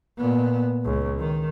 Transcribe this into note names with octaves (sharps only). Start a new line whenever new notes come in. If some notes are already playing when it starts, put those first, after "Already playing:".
A#2 B3
C#2
D#3